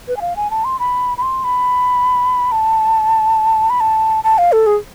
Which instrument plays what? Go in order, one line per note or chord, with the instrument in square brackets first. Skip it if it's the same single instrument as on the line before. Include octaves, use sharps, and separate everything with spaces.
[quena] B4
G#5
F5
G#5
A5
C6
B5
B5
C6
B5
A5
B5
A5
A5
F5
A4
G#4